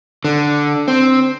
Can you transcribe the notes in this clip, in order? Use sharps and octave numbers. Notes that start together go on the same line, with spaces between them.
D3
C4